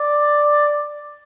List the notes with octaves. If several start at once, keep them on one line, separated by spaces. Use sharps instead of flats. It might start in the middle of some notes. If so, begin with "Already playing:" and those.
Already playing: D5